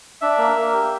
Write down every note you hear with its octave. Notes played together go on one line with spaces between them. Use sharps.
D4 E5
A#3
A#3
G4